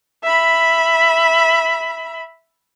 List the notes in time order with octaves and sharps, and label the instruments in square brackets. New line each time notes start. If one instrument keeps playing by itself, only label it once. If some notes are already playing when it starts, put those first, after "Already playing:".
[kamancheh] E5 B5